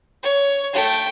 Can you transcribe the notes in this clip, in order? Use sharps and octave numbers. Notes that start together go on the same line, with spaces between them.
C#5
A3 G5